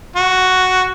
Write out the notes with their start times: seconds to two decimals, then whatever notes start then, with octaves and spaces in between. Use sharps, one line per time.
0.16 F#4